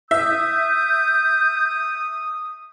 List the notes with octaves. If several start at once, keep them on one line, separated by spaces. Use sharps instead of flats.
E5 D#6 G6